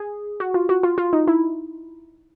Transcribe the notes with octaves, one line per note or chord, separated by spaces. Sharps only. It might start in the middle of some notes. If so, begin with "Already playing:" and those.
Already playing: G#4
F#4
F4
F#4
F4
F4
D#4
E4